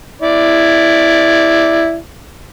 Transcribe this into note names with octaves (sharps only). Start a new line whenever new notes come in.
E4 D5